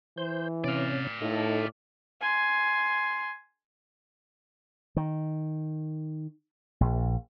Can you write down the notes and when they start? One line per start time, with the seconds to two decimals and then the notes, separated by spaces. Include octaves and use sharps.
0.18 E3 C5 G6
0.64 C3 C#4 D5 F5
1.21 A2 D#4 A4
2.21 G#5 C6
4.97 D#3
6.81 A#1